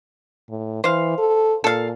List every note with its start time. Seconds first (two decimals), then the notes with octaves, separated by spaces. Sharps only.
0.50 A2
0.84 E3 C5 F5
1.18 A4
1.64 A#2 A4 F5